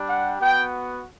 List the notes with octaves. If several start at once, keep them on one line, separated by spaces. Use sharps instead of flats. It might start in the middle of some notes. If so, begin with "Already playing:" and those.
Already playing: G3 D4 G4
F#5
B3 F#4 G5